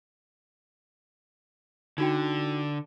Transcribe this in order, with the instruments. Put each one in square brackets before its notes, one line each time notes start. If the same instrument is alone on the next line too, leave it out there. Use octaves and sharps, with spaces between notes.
[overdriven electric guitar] D3 [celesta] D#4 F#4 G5